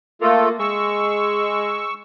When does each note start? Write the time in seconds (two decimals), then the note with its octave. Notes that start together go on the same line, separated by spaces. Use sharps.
0.22 A3 A#3 F4 A4
0.59 G#3 C#6 E6